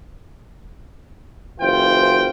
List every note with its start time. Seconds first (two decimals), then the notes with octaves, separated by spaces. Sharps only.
1.60 F#1 E3 F4 C5 G5